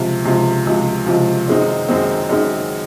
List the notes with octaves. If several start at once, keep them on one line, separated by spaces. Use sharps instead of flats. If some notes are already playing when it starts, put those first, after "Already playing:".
Already playing: C#2 C3 F3
C#2 C3 F3
C#2 C3 F3
C#2 C3 F3
F#2 D#3 G#3 C4 D#4
F#2 D#3 G#3 C4 D#4
F#2 D#3 G#3 C4 D#4